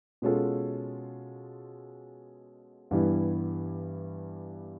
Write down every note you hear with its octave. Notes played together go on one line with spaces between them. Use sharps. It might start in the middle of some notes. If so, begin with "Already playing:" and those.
B2 G#3 C#4 F4 A4
G2 E3 G3 B3 E4